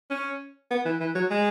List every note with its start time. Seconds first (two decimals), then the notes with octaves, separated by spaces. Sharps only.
0.10 C#4
0.71 B3
0.85 E3
1.00 E3
1.15 F#3
1.30 G#3